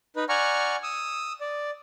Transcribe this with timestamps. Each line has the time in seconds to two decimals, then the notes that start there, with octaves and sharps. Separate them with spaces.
0.16 D#4 B4
0.29 D5 F#5 G#5 A#5 C#6 F6
0.83 D#6 E6
1.41 D5